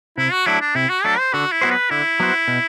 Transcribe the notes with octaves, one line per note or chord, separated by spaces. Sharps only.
C3 E4
F#4
F#3 A3 D4 E4
D4
C3 E4
F#4
F#3 A3 D4 A4
C5
D3 F#4
E4
F#3 B3 F#4 C5
B4
D3 E4
F#3 B3 F#4 C5
B2